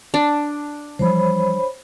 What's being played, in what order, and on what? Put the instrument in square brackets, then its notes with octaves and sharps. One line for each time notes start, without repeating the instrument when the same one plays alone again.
[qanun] D4
[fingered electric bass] E3 F3 G3 [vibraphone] C5 C#5 B5